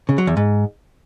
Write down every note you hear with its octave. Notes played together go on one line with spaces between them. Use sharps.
C#3
F#3
E2
G#2